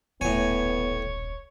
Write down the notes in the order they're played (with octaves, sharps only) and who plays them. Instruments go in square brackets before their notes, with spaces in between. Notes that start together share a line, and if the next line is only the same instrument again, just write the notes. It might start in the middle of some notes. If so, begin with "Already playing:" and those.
[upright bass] D#1 B1 [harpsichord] A2 G#5 [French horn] B3 [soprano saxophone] C#5